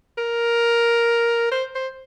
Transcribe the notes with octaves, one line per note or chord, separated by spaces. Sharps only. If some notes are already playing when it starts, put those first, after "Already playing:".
A#4
C5
C5